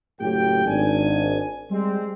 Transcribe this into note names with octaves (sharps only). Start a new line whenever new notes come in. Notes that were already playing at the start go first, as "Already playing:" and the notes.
F#1 A2 F#3 G4 G5
G#1 D4 G#5
G3 G#3 C4